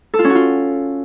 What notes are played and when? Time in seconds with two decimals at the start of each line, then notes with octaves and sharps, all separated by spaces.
0.14 A4
0.19 F4
0.24 C#4
0.30 F#4
0.35 F4